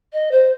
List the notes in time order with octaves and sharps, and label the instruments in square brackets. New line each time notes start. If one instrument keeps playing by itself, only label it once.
[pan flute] D#5
C5